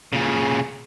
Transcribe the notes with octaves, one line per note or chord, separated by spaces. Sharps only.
A#2 C#3